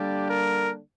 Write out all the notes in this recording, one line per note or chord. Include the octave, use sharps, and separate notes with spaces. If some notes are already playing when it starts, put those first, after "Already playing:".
Already playing: D3 G3 A#3 D4 G4
A#4